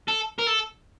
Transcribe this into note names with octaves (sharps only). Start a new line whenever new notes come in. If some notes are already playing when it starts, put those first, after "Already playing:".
A4
A#4
A4